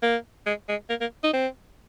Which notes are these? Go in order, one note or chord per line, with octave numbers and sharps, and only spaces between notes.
A#3
G#3
G#3
A#3
A#3
D#4
C4